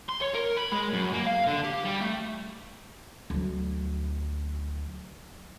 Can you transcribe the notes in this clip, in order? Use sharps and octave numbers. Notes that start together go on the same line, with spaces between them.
C6
C#5
A#4
B5
G#3
F#2
A#3
F5
D3
G4
G3
A3
D2 F#3